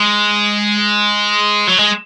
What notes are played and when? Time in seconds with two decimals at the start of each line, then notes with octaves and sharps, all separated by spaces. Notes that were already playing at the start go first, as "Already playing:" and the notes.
Already playing: G#3
1.67 F#3
1.78 G#3